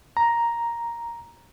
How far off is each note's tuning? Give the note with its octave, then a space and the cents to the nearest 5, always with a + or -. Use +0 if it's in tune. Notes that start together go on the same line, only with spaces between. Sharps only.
A#5 +5